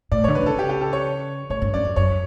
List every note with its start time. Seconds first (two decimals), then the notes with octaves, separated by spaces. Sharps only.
0.12 A2 D5
0.24 D3 C#5
0.35 B4
0.43 C#3 A4
0.59 G4
0.69 G4
0.81 A4
0.93 C#5
1.50 A2 C#5
1.62 G2
1.73 F#2 D5
1.85 F#2
1.96 F#2 C#5